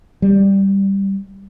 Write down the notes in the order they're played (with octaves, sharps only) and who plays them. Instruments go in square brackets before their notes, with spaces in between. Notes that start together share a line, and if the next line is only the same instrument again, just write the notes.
[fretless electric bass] G3